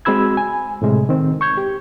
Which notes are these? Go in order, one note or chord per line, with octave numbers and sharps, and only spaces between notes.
G#3 C4 F#4 B5 E6 G#6
G#5
A2 C3 G#3
D#3 C4
C#6 G6 G#6
G4